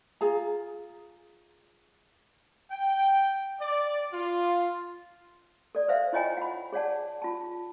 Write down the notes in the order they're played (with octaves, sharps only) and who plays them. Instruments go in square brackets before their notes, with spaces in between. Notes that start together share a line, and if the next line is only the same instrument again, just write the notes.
[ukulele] F4 G#4 A#5
[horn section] G5
D5
F4
[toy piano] A4 D5
B4 C5 E5 F5
E4 F4 C#5 D#5 G5 G#5
F#5 B5
G#4 C#5 D5 F#5 A5
F4 A5